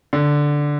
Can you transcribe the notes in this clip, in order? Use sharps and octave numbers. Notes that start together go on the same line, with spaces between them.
D3